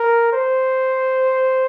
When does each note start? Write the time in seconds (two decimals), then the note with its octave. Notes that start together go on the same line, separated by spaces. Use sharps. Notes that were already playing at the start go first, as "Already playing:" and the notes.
Already playing: A#4
0.33 C5